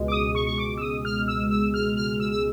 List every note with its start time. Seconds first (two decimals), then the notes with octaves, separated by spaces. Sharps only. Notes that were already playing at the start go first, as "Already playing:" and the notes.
Already playing: C#2 B2 G#3
0.08 D6
0.12 D#6
0.35 C#6
0.47 C#6
0.58 D6
0.78 E6
0.82 D#6
1.05 F6
1.28 E6
1.51 E6
1.74 F6
1.97 F6
2.20 E6
2.32 E6